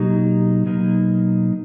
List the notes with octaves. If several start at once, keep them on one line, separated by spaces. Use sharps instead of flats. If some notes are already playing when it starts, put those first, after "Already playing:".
Already playing: B2 F#3 A#3 D#4 G4
B2 F#3 A#3 D#4